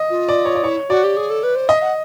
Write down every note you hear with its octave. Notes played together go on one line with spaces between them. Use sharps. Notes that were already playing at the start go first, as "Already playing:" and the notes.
Already playing: D#5
F4
D5
C#5
D5
E4 C#5
F#4 D5
G4
G#4
A4
B4
C5
D#5 E5
F#5